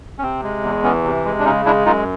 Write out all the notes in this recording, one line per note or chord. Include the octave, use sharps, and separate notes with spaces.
C#4
C3 C4
G#3
E2
E3 B3 C#4
C3
G#3
D4
C#3 C#4 D#4
G#3 D4 E4
F#2 D#4 F4